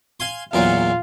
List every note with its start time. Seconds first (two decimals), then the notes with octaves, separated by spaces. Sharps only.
0.20 F5 G#5 C6
0.53 E2 A#2 F#3 F4